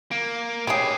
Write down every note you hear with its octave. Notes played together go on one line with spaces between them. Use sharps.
A#3 D7
C4 G4 G#4 B4 C#5 G5 D6 C7